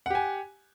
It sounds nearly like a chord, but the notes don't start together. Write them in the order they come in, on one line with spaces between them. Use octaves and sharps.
F#5 G4 G#5